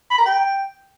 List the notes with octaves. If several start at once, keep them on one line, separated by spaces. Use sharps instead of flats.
B5
A#5
G5